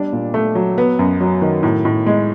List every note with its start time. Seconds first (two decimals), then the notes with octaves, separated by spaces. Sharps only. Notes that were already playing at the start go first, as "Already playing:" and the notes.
Already playing: G3 D4
0.13 A#2
0.34 A3
0.55 F#3
0.78 B3
0.99 F#2
1.21 F#3
1.42 D#3
1.63 A2
1.85 A2
2.07 G#3